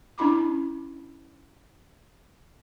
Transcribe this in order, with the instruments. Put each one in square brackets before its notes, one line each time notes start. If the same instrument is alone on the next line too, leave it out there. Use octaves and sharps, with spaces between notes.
[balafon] C#4 D4 E4 B5 D6